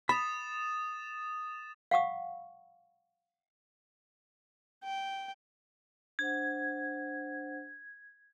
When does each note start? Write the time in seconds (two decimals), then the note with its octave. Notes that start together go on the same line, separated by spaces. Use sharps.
0.09 B5 D#6 A6 E7
1.91 F5 F#5 C#6 D#6
4.84 G5
6.19 D4 C5 F#5 G#6